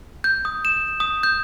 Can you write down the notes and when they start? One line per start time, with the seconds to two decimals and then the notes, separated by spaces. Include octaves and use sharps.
0.24 G6
0.45 D#6
0.65 E7
1.00 D#6
1.23 G6